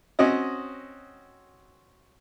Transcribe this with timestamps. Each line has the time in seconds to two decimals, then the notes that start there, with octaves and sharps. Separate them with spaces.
0.19 C4 C#4 F#4 D#5